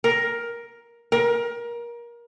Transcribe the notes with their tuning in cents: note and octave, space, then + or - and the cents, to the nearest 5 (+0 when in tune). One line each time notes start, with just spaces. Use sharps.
A#4 +10
A#4 +25